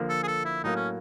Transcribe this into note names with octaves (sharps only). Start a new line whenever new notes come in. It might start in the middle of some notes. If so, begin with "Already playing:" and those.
Already playing: D3 F3 A#3
A4
G#4
A4
E4
A2 F#3 A#3 D#4
C#4